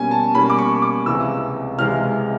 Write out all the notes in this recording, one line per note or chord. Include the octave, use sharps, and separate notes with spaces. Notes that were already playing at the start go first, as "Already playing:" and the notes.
Already playing: B2 G3 A#3 C#4 G#5
A5
B2 G3 A#3 C#4 B5
D6
C#6
D6
C#2 C3 E3 G#3 E6
C#2 C3 E3 G#3 F6